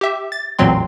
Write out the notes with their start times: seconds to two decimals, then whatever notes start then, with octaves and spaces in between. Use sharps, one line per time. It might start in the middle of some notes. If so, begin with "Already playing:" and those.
0.01 G4 E5
0.32 A6
0.59 A1 E2 A#2 F#3 C4 C6